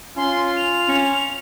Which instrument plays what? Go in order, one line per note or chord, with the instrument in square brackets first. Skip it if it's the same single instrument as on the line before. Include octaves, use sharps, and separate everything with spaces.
[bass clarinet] C#4 [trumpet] F4 [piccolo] C6
[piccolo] F7
[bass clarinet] C#4